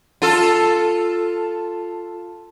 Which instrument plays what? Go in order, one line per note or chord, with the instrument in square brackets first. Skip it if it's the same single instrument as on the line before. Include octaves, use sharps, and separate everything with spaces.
[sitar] F4 A4